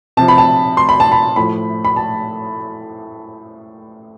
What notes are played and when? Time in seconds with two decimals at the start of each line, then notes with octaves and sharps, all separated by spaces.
0.17 C3 F3 A5
0.28 B5
0.38 A5
0.77 C6
0.89 B5
1.00 A5
1.12 B5
1.36 A2 F3 B5
1.85 B5
1.96 A5